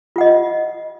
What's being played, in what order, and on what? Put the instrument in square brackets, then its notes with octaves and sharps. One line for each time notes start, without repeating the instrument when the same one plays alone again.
[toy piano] F4
F#5
D#5